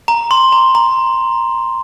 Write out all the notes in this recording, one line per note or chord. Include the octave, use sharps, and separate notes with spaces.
A#5
C6
A#5
A#5